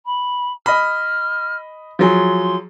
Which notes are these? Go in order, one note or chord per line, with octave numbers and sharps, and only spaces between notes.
B5
D#5 B5 F6
F3 F#3 G#4 C6